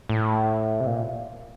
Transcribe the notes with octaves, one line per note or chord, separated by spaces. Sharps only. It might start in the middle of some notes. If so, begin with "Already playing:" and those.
A2
C3
A#2